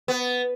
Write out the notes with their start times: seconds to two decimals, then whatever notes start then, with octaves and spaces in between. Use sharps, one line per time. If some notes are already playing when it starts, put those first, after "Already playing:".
0.08 B3